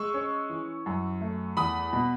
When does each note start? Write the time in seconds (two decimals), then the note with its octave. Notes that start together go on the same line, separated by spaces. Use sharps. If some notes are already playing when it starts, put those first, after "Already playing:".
Already playing: G#3 C#6 E6
0.14 C#4
0.50 E3
0.86 F#2
1.21 A3
1.57 E2 B5 D#6
1.93 B2